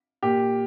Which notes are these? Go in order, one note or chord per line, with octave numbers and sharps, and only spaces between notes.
A#2 G4